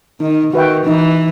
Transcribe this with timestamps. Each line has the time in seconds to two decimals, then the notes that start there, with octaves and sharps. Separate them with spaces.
0.20 D#3 D#4
0.54 D#3 F#4 B4 E5 G5
0.86 E3 D#4